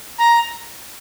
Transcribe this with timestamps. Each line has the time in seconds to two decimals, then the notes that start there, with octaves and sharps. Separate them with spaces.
0.18 A#5